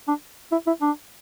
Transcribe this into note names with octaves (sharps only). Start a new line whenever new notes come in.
D4
E4
E4
D4